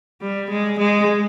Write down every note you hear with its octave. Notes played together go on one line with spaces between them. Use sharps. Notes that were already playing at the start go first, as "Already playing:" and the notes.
G3
G#3
G#3